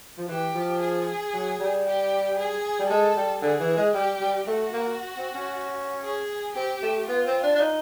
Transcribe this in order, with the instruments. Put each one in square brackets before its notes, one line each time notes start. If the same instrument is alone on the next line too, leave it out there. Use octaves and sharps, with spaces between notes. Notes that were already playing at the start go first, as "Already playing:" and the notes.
[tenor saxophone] F3
[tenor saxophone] E3 [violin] G4
[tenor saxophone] F3
[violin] G#4
[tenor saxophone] F#3
G3
[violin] G4
G#4
[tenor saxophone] G3
[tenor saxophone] G#3 [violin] A4
[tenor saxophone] G3
[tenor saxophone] D3 [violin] G#4
[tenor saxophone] E3
G#3
[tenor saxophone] G3 [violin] G4
[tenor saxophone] G3
[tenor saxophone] A3 [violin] F#4
[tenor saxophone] A#3
C4
C#4
[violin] G#4
[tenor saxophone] C4 [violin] G4
[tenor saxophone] A3
[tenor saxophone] B3 [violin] F4
[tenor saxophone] C4
D4
D4
D#4